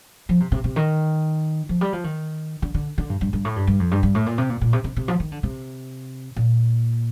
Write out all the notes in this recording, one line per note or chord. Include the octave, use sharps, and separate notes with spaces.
F3
C3
C3
C3
D#3
F3
G3
F3
D#3
D3
D3
D3
G2
G2
G2
A2
G2
G2
F2
G2
G2
A2
A#2
C3
A#2
A#2
C3
C3
C3
F3
D#3
D3
C3
A#2